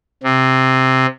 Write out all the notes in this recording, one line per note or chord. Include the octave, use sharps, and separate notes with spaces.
C3